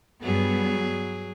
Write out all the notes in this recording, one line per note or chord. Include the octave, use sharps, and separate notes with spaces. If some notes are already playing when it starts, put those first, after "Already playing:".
G2 F#3 G3 B3 G#4